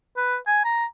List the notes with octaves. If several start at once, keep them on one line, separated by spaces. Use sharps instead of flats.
B4
G#5
A#5